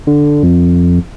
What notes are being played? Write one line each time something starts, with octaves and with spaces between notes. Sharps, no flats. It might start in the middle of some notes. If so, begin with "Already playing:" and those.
D3
F2